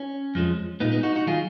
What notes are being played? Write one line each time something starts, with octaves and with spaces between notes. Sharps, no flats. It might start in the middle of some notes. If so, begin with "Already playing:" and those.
Already playing: C#4
F2 F3 G#3
A#2 G#3 B3 D#4
B3 D#4
D#4 F#4
D#4 F#4
D#3 F#3 F4 G#4